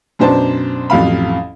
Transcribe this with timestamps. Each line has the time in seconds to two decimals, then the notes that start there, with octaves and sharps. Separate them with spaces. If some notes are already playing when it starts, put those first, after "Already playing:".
0.19 F#2 B2 D4 C5 A5
0.90 A1 F2 F#3 F5 B5